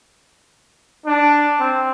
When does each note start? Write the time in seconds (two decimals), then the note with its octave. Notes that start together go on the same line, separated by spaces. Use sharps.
1.06 D4
1.60 C4